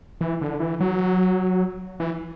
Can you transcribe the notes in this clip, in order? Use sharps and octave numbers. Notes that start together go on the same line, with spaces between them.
E3
D3
E3
F#3
E3